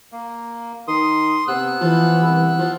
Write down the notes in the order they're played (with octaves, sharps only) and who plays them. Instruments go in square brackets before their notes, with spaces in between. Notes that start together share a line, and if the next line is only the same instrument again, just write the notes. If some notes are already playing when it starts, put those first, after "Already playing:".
[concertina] A#3
[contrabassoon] D#3 [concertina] C6 D#6
[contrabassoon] C3 [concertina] B3 E6 F#6
[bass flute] E3 [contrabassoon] F3
[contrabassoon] C2
F3